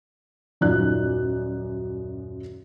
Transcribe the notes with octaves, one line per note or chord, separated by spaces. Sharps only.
D#1 F#2 D#4 F4 D5 F#6